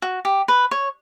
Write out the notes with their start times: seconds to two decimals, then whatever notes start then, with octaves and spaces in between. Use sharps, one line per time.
0.02 F#4
0.25 G4
0.48 B4
0.71 C#5